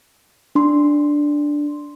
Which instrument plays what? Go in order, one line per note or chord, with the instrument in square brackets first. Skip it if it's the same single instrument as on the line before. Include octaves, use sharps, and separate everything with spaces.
[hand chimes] D4 C6